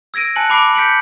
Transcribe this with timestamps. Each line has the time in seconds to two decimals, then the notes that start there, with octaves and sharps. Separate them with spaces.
0.14 E6 G#6 A#6 D7 D#7
0.36 G#5 A5 F#6 C#7 F#7
0.50 B5 D6 C7 D7
0.75 G6 B6 C#7 D7 F#7